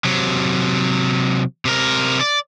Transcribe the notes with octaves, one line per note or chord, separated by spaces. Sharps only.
C3 F#3
C3 A#4
D5